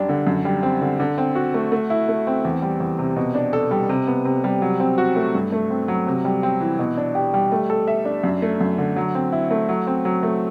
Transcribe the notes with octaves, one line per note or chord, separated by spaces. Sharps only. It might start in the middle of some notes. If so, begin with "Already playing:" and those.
Already playing: F#2 G3 D4
D3
F#2
G3
C4
D3
D3
C4
F#4
A3
A3
E4
A3
C4
E2
G3
E2
C3
B2
D4
A4
G3
C3
B3
C3
G3
F#3
C4
F#4
A3
G2
A3
C4
F#3
C3
G3
C4
E3
B2
D4
G4
G3
A3
A4
E5
D4
F#2
A3
F#2
D3
F#3
C4
E4
A3
F#3
C4
F#3
A3